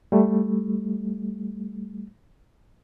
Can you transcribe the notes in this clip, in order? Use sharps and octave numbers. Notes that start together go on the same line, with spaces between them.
G3 A3